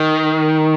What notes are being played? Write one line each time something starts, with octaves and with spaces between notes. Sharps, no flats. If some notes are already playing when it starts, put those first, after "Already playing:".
Already playing: D#3